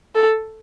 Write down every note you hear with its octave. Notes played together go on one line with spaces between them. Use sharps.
A4